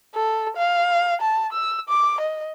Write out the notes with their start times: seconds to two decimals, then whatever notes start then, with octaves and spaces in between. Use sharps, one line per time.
0.14 A4
0.57 F5
1.21 A5
1.53 E6
1.89 D6
2.20 D#5